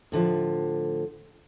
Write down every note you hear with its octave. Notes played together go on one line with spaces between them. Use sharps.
A2 D3 E3 F3